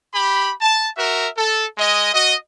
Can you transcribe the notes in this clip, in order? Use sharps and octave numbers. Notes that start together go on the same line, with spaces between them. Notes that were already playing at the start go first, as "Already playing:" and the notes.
G4 B5
A5
F#4 A#4 E5
A4
G#3 D#5
F#4 D#5